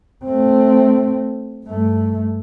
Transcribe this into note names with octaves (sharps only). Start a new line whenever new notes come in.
A3 C4
G2 A3